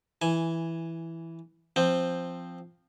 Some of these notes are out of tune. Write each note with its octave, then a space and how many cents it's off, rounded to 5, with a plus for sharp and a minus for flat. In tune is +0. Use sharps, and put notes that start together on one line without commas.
E3 +0 G#5 +0
F3 +0 C4 +0